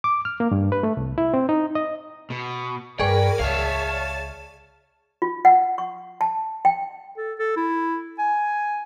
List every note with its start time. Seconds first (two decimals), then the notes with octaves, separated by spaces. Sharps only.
0.04 D6
0.25 F6
0.40 A#3
0.51 G2
0.72 B4
0.83 A3
0.97 C2
1.18 E4
1.34 C4
1.49 D#4
1.75 D#5
2.30 B2
2.99 G2 G#4 A#4 B4 D5 G5 C#6
3.39 C#2 C#5 E5 F5 A5
5.22 F4
5.45 F#5
5.78 C#6
6.21 A5
6.65 G5
7.17 A4
7.39 A4
7.56 E4
8.18 G#5